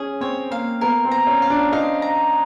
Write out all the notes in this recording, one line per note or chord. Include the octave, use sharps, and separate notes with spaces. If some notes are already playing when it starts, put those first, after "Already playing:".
Already playing: C#4 G#4
C4 C#5
A#3 F5
B3 A#4
C4
A#5
C#4
F5
D4
D#4 F5
A#5